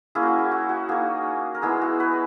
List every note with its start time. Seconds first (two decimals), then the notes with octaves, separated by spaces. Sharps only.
0.15 A#3 C#4 E4 G#4
0.23 F#4
0.39 F#4
0.52 F#4
0.69 F#4
0.89 A#3 D#4 G#4
1.54 A#4
1.62 G#3 B3 E4 G#4
1.82 F#4
2.00 B4